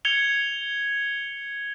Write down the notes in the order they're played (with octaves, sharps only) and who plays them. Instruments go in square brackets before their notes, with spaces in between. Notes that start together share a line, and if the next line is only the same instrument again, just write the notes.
[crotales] G#6 C#7 F7 G7